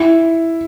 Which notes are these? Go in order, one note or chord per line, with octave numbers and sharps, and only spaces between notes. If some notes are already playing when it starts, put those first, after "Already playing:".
Already playing: E4